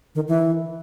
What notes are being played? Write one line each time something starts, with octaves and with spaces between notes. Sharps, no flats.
D#3
E3